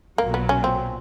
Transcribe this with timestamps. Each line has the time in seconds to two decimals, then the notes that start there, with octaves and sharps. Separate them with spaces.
0.18 B1 A#2 F#3 A#3
0.34 B3
0.49 C#4
0.64 C4